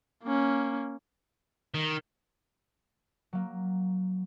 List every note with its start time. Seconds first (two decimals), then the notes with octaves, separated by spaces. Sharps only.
0.23 A#3 C#4
1.74 D#3
3.33 F#3 A#3